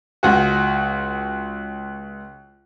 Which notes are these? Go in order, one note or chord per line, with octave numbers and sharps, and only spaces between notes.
C#2 F#4